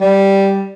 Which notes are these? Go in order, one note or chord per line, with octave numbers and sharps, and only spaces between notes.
G3